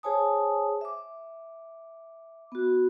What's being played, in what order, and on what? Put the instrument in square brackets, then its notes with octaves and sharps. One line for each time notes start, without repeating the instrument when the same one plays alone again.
[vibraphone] G#4 C5 C#5 G#5 A5 D#6
E5 D6
B3 F#4